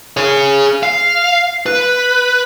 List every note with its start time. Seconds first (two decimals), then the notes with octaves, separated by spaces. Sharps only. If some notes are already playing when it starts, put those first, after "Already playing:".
0.17 G#4 C#5
0.83 F5
1.66 B4